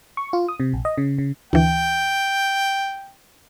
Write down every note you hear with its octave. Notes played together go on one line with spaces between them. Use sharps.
C#6
F4
D#6
C3
A#1
D#5
C#3
C#3
D2 E3 G5